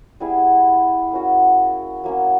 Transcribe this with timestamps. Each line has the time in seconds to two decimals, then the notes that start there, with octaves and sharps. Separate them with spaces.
0.20 G3 B3 E4 G#4
1.12 A#3 C#4 F#4
2.04 F#3 A#3 C#4